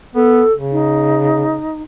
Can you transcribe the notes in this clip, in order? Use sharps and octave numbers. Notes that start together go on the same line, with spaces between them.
B3 A4
C#3
D#4